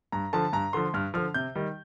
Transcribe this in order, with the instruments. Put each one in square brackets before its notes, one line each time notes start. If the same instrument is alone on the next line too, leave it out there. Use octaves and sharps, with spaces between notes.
[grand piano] G2 A#5
D3 F3 A5
G2 A#5
D3 F3 C6
G2 F6
D3 F3 F6
C3 G6
D#3 G3